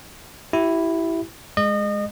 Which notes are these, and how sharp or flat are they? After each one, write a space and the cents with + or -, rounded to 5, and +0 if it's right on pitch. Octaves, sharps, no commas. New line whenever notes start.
E4 +0 G4 -35
G#3 +0 D#5 -30